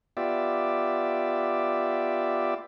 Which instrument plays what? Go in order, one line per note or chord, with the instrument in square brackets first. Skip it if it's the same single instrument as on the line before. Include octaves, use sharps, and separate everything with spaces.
[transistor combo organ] B3 F4 G4 D5 E5